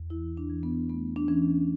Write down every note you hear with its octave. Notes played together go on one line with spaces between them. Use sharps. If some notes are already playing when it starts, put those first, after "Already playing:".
Already playing: E2
E3 E4
D4
E3
B3
A3 B3
D4
E3 C#4